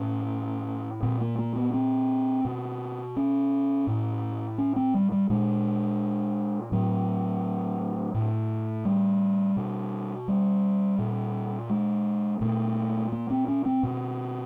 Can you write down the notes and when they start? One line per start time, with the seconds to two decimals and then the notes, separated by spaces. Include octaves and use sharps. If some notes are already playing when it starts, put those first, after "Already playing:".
Already playing: A2 C#4
1.02 A#2 C4
1.21 A#3
1.38 A#3
1.56 B3
1.74 C4
2.45 B2
3.17 C#4
3.87 A2
4.58 C#4
4.76 C4
4.94 G3
5.12 G3
5.30 A#2 G#3
6.72 A2 F#3
8.14 A2
8.85 G3
9.57 B2
10.28 G3
10.99 A#2
11.70 G#3
12.41 A#2 A3
13.12 A#3
13.30 C4
13.48 C#4
13.66 C4
13.83 B2